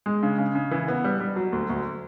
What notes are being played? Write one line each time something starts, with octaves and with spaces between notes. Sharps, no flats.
G#3
C#3
C#3
C#3
E3
B3
G3
G3
F#3
D2
D2